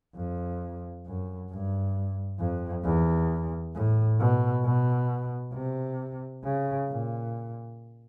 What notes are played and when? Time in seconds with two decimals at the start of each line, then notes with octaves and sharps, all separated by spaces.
0.15 F2
1.05 F#2
1.51 G2
2.39 F2
2.84 E2
3.75 A2
4.19 B2
4.64 B2
5.53 C3
6.44 C#3
6.89 A#2